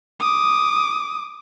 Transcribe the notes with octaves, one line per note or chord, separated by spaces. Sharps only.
D6 D#6